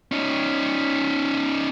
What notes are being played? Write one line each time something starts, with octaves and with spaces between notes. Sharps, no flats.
C#4 D#4